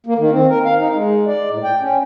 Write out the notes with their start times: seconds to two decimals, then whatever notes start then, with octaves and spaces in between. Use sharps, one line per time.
0.06 A#3
0.18 D#3
0.31 C4
0.49 A#4
0.65 F5
0.79 D#4
0.93 G#3
1.27 D5
1.50 A2
1.64 G5
1.81 C#4